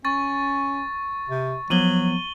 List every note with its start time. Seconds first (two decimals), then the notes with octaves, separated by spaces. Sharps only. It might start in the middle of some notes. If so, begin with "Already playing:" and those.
0.05 C#4 C#6 A6
1.29 C3
1.70 F3 F#3 B3 D#7 F#7 G7